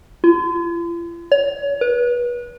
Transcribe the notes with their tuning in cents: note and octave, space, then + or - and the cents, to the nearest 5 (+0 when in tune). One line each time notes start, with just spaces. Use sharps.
F4 -45
C#5 +30
B4 -30